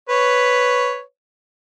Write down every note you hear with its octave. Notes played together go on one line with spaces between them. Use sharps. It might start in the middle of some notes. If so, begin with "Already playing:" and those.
B4 C#5